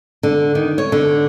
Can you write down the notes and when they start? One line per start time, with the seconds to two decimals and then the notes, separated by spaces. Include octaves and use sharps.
0.23 D3
0.55 D#3
0.78 C#5
0.92 D3